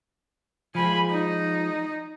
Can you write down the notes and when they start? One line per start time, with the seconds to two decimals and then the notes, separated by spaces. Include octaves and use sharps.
0.75 F3 G#3 G#5 B5
1.10 D#4